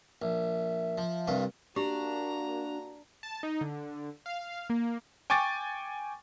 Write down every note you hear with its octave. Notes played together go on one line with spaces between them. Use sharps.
A#1 E5
F3
C2 G2 F4
A#3 D4 F#4 G4 A#5 C#6
A5
D#4
D3
F5
A#3
G5 G#5 C#6 D6 A6